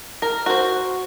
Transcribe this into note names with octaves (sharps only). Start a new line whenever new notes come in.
A#4
F#4 C5